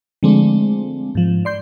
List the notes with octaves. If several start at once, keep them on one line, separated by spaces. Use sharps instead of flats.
D3 F3 G#3 A3 C4 D4
G#2 F3
D5 C6 G6